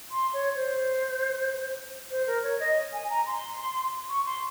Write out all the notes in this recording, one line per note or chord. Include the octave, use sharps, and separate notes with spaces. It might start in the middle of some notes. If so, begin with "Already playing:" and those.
C6
C#5
C5
C5
A#4
C#5
D#5
G#5
A#5
C6
C#6
C6